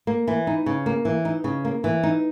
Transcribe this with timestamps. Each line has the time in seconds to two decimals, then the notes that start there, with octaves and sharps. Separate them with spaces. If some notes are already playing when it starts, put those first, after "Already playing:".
0.07 A#3
0.28 E3
0.47 D#4
0.66 C#3
0.86 A#3
1.05 E3
1.25 D#4
1.44 C#3
1.65 A#3
1.84 E3
2.03 D#4